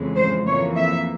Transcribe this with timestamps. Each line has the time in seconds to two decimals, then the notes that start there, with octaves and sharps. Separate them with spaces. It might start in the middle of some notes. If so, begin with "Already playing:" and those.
Already playing: F2 C#3 E3 G#3
0.16 C5
0.46 F2 E3 A#3 C#5
0.76 E5